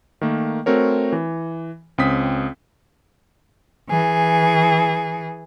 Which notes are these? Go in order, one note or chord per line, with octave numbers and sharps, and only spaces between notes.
D#3 A3 A#3
A3 C4 F#4 A#4 C#5
E3
C#2 C4 C#4 D#6 B6
E3 G#4